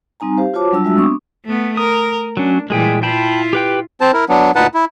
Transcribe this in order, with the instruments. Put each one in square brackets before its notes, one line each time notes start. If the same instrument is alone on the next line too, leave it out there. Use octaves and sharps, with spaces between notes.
[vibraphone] G3 C4 D#4 G#5 A#5
G4 C5 F5
F4 F#4 C5 C#5 A5 D6
F#3 G3 D4 F4 A5 E6
G3 G#3 D4 F#4 E5 E6
B3 C4 D4 C#6 D#6
[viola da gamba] A3 B3
[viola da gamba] A#4 [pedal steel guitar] D#6
[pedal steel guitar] F#3 C#4 [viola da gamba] D4
[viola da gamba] A#2 E3 G3 [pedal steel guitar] G#3 G#4 G5
[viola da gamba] E4 F4 [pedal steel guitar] G5 A5 B5
[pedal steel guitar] G4 B4 G5
[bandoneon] C4 C5 A5
E4 A#4
F#3 B3 D4
D2 A#2 D#4 B4 F#5 A5
E4